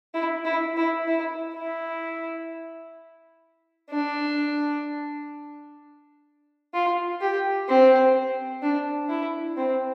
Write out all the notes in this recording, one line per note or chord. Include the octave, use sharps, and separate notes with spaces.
E4
E4
E4
E4
E4
D4
F4
G4
C4
D4
E4
C4